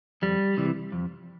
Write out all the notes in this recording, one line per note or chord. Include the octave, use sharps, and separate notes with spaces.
F2 G3
C3 E3
F2